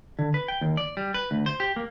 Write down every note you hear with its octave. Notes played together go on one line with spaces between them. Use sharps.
D3
B4
G5
D#2
D5
G3
B4
D2
C5
G4
A#3